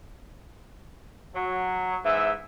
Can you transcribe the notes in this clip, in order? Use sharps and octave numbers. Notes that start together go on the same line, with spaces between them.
F#3
G#2 E3 E5